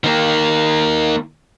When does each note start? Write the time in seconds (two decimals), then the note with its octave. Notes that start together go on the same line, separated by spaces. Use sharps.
0.04 D#3 A#3